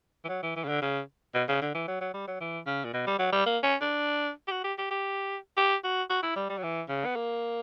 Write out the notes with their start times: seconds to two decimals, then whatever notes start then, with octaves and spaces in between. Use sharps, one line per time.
0.25 E3
0.29 F#3
0.43 E3
0.56 E3
0.64 C#3
0.68 D3
0.82 C#3
1.34 B2
1.49 C#3
1.62 D3
1.75 E3
1.88 F#3
2.01 F#3
2.14 G3
2.28 F#3
2.41 E3
2.66 C#3
2.84 A#2
2.93 B2
3.07 G3
3.19 F#3
3.33 G3
3.46 A#3
3.63 C#4
3.81 D4
4.48 G4
4.51 F#4
4.64 G4
4.78 G4
4.91 G4
5.57 G4
5.84 F#4
6.10 F#4
6.23 E4
6.36 G3
6.50 G3
6.58 F#3
6.63 E3
6.89 C#3
7.05 B3
7.16 A#3